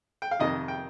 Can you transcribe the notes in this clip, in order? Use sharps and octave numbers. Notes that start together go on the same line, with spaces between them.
G5
F5
F2 C3 D#3 D#5
G5